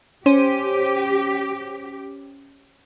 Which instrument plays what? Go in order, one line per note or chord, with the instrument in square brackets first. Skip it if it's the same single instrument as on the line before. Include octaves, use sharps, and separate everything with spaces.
[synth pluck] C#4 C5 D#7 [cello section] G4